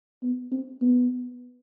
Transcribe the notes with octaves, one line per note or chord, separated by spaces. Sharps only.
B3
C4
B3